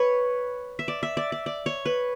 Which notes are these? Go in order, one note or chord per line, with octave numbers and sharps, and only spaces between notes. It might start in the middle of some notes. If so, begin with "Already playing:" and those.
Already playing: B4 C#5
E5
D5
E5
D5
D5
D5
C#5
B4